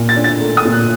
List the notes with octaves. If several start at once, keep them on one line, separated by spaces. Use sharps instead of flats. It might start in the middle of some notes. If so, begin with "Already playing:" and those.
Already playing: A#2
A6
D4
A6
A3
D#6
A#2
F#6